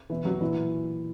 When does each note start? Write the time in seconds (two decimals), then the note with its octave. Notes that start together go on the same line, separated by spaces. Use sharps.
0.10 B2 E3 E4
0.25 F#3 F#4
0.41 A#2 E3 E4